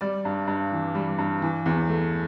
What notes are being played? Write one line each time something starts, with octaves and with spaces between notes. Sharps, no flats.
G3 D5
G2
G2
E3
G3
G2
E3
E2
A3